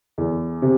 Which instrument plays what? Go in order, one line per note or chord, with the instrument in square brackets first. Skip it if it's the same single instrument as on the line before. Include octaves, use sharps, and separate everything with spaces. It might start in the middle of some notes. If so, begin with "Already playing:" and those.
[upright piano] E2
C3